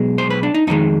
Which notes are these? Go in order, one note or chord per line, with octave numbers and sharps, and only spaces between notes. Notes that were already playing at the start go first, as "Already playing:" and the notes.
Already playing: B1 B2 G#3
C5
B4
D4
D#4
F2 D#3 G#3 D#4